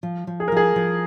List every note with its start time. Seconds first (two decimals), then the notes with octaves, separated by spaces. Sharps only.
0.03 F3
0.27 F3
0.40 G#4
0.48 A#4
0.52 F3 G#4
0.76 F3